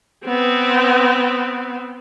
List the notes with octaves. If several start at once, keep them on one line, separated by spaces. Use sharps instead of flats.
B3 C4